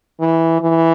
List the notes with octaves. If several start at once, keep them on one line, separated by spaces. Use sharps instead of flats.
E3
E3